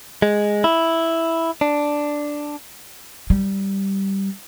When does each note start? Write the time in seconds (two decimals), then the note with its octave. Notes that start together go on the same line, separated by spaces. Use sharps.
0.22 G#3
0.64 E4
1.61 D4
3.30 G3